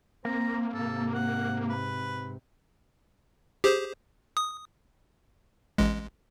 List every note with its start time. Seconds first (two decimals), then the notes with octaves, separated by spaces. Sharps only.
0.25 A#3 C4 A#5
0.74 G#2 C3 A4
1.14 F#5
1.69 B4
3.64 G4 G#4 C5
4.37 D#6
5.78 A1 G#3